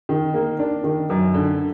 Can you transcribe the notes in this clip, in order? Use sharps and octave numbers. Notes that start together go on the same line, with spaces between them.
D#3
A#3
D4
D#3
F#2
D3